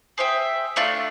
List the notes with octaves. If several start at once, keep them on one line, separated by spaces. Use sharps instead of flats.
G#4 C5 E5 G5
A3 D4 F4